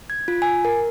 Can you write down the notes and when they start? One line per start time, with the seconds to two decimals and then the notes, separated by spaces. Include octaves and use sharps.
0.10 G#6
0.28 F4
0.42 G#5
0.65 A#4